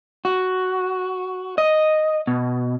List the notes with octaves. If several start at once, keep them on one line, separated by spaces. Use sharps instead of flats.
F#4
D#5
B2